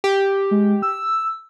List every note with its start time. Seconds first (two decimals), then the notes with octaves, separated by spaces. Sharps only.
0.04 G4
0.51 G#3
0.82 E6